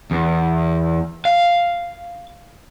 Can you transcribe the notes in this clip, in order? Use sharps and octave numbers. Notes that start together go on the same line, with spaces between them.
E2
F5